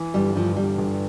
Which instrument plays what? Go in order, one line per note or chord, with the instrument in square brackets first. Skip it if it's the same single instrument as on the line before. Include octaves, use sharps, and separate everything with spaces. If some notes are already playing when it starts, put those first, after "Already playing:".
Already playing: [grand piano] E3
[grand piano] G1 [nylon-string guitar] G3
[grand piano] G2 [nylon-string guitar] F3
[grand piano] G1 [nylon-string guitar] G3
[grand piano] G1